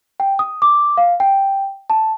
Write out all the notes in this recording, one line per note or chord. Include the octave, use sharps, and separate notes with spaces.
G5
D#6
D6
F5
G5
A5